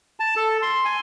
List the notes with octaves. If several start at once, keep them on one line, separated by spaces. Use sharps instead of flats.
A5
A4
C6
G#5